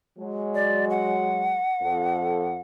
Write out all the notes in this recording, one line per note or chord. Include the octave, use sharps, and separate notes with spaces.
F#3 G#3
D5
F#5
F2 A4